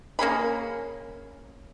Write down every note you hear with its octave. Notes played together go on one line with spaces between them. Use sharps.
A#3 C#4 G#4 B5